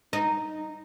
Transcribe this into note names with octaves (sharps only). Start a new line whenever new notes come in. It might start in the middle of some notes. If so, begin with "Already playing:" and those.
D#4